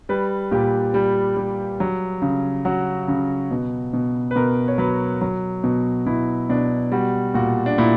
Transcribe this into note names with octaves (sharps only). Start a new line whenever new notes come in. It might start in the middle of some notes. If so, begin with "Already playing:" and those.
G3 B4
A#2 G4
G3
G3
F#3
C#3
F#3 F#4
C#3
B2
B2
B4
B2 A#4
C#5
F#3 B4
F#3
B2
B2 E4
B2 D4
G3 F#4
A#2 F#4
D4
A#2 E4